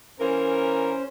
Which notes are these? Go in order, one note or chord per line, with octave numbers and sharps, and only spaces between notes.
E3 A#3 C#4 A#4 C5